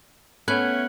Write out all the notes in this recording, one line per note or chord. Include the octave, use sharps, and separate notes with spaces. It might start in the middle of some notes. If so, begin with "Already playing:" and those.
A3 B3 C#4 F#6 G#6 F#7